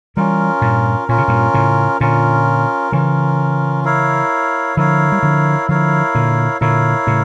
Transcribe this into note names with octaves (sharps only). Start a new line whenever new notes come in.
E3 G3 C#4 F4 A#4
G2 A#2
A#2 C#4 F4 A#4
C#3
G2 A#2
A2 C#3
A#2 D3 C#4 F4 A#4
C#3 E3 C#4 F4 A#4
E4 A#4 C#5 F5
D3 F3 E4 A#4 C#5 F5
G3
D3 F3
D3 F3 E4 A#4 C#5 F5
A#2 D3
A#2 D3 E4 A#4 C#5 F5
A2 C#3